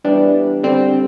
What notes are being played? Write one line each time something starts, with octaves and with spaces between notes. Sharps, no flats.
E3 G3 B3 D4
D3 G3 C4